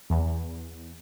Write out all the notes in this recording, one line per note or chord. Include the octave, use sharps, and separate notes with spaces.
E2